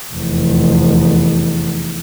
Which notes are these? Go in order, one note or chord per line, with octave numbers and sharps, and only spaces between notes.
F1 E2